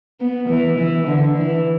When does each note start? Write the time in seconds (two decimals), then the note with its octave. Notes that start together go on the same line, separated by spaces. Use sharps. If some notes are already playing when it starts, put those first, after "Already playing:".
0.21 B3
0.49 E3
0.78 E3
1.07 D3
1.37 E3